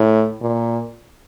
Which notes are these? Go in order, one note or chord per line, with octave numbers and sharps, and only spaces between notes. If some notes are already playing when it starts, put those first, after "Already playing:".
Already playing: A2
A#2